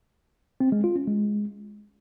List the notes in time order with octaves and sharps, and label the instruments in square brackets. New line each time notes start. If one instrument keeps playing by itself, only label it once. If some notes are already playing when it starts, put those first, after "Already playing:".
[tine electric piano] C4
G#3
F4
C#4
G#3